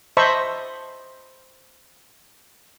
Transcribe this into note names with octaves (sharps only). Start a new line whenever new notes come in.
C5 D#5 E5 A5 B5 C#6